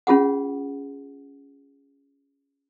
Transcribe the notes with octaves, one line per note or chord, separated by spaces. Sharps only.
C#4 F4 G#4 F#5